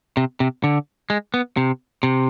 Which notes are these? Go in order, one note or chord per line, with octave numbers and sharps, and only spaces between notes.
C3
C3
D3
G#3
B3
C3
C3